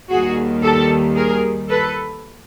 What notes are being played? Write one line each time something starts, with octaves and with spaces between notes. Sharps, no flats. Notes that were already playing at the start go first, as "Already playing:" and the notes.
D#2 D#3 G3 F#4 G#4
G4 A4
G#4 A#4
A4 B4